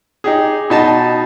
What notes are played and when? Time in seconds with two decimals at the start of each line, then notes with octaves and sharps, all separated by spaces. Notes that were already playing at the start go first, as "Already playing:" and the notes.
0.24 D#4 G4 G#4
0.70 B2 D#4 A5